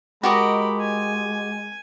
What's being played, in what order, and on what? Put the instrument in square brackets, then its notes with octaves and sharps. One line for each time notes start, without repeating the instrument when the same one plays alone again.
[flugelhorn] G#3 [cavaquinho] F#4 G4 D#5 [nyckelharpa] A#4 B5
[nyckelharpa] G#5